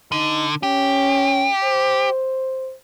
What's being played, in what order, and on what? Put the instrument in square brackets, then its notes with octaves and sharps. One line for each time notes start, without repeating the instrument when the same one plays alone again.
[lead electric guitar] D3 [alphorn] D#4
[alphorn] C#4 [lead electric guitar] G4
[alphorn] C5